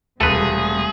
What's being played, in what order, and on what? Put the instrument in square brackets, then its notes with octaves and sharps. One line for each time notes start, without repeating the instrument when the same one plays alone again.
[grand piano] E1 [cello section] C3 G3 A3 [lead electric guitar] G#4 [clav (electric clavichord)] A4 B4